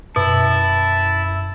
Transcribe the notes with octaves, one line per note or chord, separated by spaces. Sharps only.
F#2 B2 E4 A5